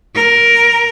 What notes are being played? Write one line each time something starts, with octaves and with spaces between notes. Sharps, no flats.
A#4